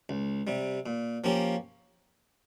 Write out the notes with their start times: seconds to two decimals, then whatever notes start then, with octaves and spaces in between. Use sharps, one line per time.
0.09 C#2
0.47 C3 G3
0.86 A#2
1.24 F3 A#3 C#4 G4